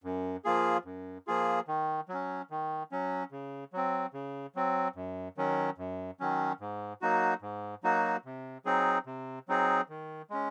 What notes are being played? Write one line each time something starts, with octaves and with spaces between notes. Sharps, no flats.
F#2
F3 A#3 F4 G#4
F#2
F3 A#3 F4 G#4
D#3
F#3
C#4
D#3
F#3 C#4
C#3
F#3 C4
C#3
F#3 C4
F#2
D#3 F#3 C#4
F#2
D#3 F#3 C#4
G#2
F#3 A#3 D#4 F#4
G#2
F#3 A#3 D#4 F#4
C3
F#3 C4 D#4 G#4
C3
F#3 C4 D#4 G#4
D#3
G#3 C#4